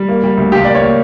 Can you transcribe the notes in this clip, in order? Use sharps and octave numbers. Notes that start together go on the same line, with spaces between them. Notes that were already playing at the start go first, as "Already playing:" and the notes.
Already playing: G3
A#3
G3
D2
C#2 G4
A#3 D5
C#5
A#3